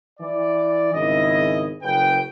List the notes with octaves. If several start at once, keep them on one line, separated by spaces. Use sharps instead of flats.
E3 D5
G#1 C#3 E4 D#5
F#1 C#3 B4 G5